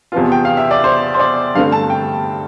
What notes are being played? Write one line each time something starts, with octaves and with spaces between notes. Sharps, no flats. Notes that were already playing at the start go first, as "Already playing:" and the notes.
E2 C3 F3 B3 F4
G5
F5
E5
D5
C5
C5
D5
G2 D3 A3 C4 F5
A5
G5